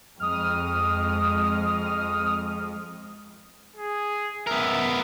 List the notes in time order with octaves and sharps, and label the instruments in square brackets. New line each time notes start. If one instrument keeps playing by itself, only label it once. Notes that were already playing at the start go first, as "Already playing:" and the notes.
[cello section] F2 G#3 [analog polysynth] D#6 F6
[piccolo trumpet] G#4
[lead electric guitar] B3 A#4 [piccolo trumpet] E5